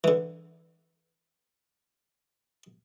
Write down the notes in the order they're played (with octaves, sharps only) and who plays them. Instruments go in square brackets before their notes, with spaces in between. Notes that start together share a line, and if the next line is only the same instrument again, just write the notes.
[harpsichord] D3 E3